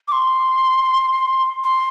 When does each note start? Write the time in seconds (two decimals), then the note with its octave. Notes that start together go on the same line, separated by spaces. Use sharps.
0.08 D6
0.12 C6
1.64 C6